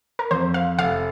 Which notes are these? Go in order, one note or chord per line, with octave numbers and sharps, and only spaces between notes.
A#4
F2 C5
F5
F1 F5